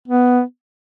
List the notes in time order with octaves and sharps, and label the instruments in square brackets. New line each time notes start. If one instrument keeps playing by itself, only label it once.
[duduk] B3